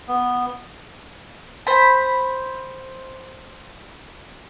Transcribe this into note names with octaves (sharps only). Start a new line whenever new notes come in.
B3
C5 B5